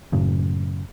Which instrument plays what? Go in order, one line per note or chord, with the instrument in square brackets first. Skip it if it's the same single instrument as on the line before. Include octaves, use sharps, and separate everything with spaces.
[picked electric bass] F#2 A2 C#3 F#3